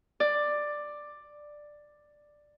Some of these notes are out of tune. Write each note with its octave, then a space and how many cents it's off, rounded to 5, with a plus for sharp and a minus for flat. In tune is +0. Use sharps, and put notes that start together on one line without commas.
D5 +10